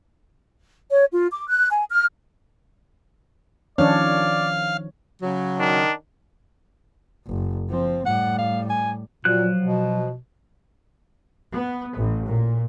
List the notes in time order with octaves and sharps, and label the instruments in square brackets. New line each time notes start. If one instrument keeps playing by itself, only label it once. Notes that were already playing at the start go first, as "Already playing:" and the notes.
[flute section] C#5
F4
D6
F#6
G#5
F6
[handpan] D#3 F3 C#5 [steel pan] C#4 D4 [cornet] D5 [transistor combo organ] F5
[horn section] C#3 F#3
[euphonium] D#3 [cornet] D4
[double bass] F#1
F3 C4
[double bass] A2 G3 [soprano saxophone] F#5
[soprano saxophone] F5
G#5
[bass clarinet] A#2 [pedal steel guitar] F3 F#6 [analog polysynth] F#3
[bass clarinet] B2
[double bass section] B3
A1
A#2